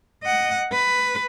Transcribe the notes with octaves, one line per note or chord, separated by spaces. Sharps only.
D#5 F#5
B4